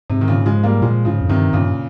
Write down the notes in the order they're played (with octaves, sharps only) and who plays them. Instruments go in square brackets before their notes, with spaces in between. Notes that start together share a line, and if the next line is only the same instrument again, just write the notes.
[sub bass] G#2 [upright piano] C3
[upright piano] D#3
A#2 C#3
F3 G#3
G3 A#3
[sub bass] A#2 [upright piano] F3 G#3
[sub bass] G#2 [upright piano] C#3 F3
[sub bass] F2
[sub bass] G2 [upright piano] C3 D#3
[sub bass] G2 [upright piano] A#2 C#3